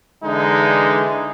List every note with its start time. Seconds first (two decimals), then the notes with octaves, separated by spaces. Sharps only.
0.24 D3 E3 G#3 D#4